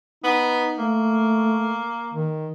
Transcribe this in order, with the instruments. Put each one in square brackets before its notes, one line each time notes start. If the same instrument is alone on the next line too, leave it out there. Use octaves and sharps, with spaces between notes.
[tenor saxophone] B3 [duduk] D#4
[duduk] A3 [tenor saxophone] A#3
[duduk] D#3